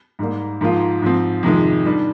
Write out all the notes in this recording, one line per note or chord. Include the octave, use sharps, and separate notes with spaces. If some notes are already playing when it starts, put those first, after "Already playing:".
G#2 G3 A#3
G#2 F3 A#3 F4
G#2 F3 C4
F2 C3 D#3 G#3
D#3 G3 D4